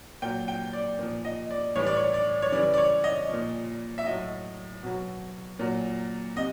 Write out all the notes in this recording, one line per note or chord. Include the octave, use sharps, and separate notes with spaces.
A#2 F#3 G5
G5
D5
A#2 F3
D#5
D5
A2 E3 G3 C#5
D5
C#5
D5
C#5
C#3 E3 G3 D5
D5
C#5
D#5
A#2 F3
E5
A2 F#3 D#5
B2 F#3
A#2 F#3
C3 D#5